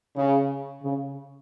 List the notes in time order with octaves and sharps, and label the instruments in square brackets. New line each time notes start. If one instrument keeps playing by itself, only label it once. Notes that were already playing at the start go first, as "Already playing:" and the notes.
[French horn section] C#3
C#3